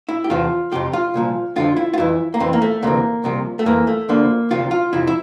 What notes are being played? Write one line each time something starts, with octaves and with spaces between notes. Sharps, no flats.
E4
G4
E2 C3 F3 F4
F2 C3 F3 G4
F4
C2 A#2 F3
F2 D3 F3 F4
E4
F4
F2 E3 E4
A#3
F2 E3 C4
A#3
A3
D2 C3 E3 A#3
C2 C3 F3
A3
F2 E3 A#3
A3
D2 D3 F3 A#3
D2 C3 F3 F4
F4
F2 C3 F3 E4
E4